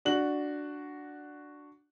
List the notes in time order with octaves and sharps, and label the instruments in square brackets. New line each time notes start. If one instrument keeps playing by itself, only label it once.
[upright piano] D4 F#4 F#7